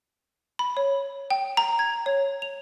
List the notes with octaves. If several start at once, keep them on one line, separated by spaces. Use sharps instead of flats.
B5
C#5
G5
A#5
G#6
C#5
F7